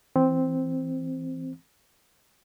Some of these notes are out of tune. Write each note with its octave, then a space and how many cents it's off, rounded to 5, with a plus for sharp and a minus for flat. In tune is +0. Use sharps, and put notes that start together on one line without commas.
E3 +0 C4 +0